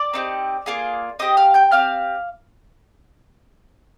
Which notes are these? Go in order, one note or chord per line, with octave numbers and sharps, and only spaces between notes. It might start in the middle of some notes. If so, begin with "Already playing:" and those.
Already playing: D5 D6
C4 D#4 G4
A#3 F4 G#4
C4 G4 D#5 D#6
F5 F6
G5 G6
C4 G4 F5 F6